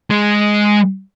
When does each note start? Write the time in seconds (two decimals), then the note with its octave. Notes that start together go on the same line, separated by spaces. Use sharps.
0.10 G#3